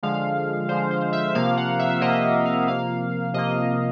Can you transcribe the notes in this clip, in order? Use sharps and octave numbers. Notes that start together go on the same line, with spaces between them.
D3 F3 G#3 F5
D3 F3 G#3 C5
C5
E5
C3 F3 A#3 F5
F#5
E5
C3 F3 A#3 D#5
F5
C3 F3 A#3 F5
C3 F3 A#3 D#5